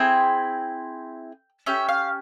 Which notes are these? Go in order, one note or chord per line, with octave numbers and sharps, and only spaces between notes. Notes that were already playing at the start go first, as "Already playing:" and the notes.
Already playing: C4 E4 G#4 G5
C#4 G4 E5
F5